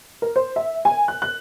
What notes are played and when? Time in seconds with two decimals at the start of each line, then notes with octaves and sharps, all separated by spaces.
0.22 A#4
0.36 C5
0.56 E5
0.85 G#5
1.08 F#6
1.22 F#6